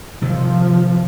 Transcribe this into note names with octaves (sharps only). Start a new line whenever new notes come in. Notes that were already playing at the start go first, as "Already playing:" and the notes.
C3 D#3 F3